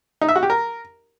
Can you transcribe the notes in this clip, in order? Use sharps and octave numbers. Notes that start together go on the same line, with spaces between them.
D#4
E5
F#4
G4
A#4